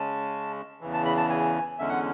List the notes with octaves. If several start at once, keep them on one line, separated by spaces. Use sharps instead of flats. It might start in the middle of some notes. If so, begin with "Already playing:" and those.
Already playing: C#3 G#3 C#4 A5
E2 C#3 E3
A5
B5
A5
G#5
E2 D3 G#3 C#4 E5
F#5